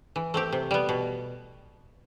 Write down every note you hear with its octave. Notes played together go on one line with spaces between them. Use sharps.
E3
A3 C4 G4
C3
G3 B3
B2